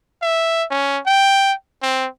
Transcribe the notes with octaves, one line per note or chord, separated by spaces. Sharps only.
E5
C#4
G5
C4